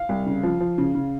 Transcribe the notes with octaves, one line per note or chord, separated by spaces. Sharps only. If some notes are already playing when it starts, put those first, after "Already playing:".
Already playing: F5
C2
C#3
F3
F3
C#3
C#3